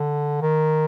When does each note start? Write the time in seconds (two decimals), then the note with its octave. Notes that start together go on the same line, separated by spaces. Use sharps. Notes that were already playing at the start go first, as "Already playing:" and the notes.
Already playing: D3
0.41 D#3